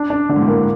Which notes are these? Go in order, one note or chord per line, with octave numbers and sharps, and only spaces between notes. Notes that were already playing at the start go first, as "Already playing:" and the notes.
Already playing: D4
D4
D3 D4
G#2
A2
A#3
A2